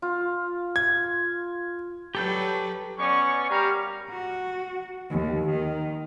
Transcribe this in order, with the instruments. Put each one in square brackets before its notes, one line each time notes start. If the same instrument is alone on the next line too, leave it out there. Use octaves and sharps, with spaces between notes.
[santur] F4
[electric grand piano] G#6
[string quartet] F#3 G3 B4 [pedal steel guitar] G4 A4 G6
[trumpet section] B3 C#4 D5 C#6
G3 G4 A#4 F5 A#5
[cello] F#4
D#2
D#3